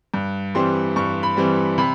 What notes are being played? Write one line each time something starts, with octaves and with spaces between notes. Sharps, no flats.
G2
E3 G3 C4 C6
G2 C#6
B5
E3 G3 C4
C3 B5